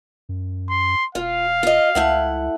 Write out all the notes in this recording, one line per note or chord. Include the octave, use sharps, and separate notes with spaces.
F#2
C6
E1 F4 F5
F4 D#5
C#2 A3 E4 F#5